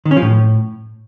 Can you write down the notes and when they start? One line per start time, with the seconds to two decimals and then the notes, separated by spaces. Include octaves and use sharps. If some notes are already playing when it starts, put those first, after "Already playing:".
0.05 D#3
0.11 C#4
0.17 F3
0.22 A2